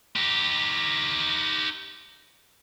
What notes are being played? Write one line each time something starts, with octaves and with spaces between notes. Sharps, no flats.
D#4 G4